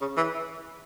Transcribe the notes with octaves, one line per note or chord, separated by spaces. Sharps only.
C#3
E3